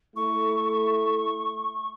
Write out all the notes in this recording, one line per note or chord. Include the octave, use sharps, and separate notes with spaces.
A3 E4 A4 C#6